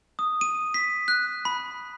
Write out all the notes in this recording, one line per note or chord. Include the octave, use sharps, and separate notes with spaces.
D#6
D#7
B6
F#6
B5